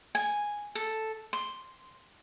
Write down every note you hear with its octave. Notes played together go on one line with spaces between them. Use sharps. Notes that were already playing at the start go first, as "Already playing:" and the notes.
G#5
A4
C6